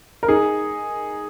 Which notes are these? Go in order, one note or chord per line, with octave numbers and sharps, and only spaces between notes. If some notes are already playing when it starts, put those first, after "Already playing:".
A#4
D#4 G#4